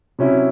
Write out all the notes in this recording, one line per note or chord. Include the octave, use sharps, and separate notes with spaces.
C3 F#3 C#4 E4